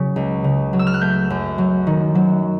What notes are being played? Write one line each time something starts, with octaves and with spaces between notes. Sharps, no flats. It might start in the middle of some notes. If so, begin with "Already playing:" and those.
Already playing: C#3 F#3
C#2
C#3
F#3
E6
F6
F#6
A3 G6
F#2
F#3
D#3
F#3